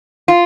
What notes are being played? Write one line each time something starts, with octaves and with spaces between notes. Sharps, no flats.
F4